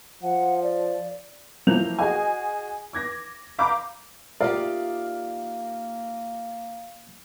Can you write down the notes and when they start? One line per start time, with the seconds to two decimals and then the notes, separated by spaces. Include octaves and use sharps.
0.23 F3 F#5
0.62 D5
1.67 F3 F#3 A#3 E4 G6 F7
1.99 F#4 G#4 D#5 G#5
2.93 D6 G#6 A#6
3.59 F5 A#5 B5 D6 G6
4.41 A#3 D#4 F4 G4 A#4 D5 E5 F5